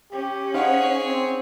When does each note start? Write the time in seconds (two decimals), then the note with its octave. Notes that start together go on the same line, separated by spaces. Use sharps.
0.12 C#4 G4
0.54 D#4 G#4 C5 C#5 F5 F#5
1.04 C4